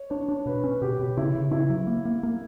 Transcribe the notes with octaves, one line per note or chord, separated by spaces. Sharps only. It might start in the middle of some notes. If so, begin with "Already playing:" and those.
Already playing: C#5
D4 C#5
D4
B2 B4
C#4
B2 G4
B2
C#3 E4
C#3
C#3 E4
F#3
A#3
A#3
A#3